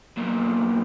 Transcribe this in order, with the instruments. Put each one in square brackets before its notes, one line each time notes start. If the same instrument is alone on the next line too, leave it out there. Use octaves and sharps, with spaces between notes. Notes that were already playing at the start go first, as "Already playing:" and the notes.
[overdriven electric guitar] B1 A#2